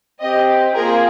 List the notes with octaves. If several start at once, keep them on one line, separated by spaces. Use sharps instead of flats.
C4 G4 D#5
A#3 F4 G#4 A#4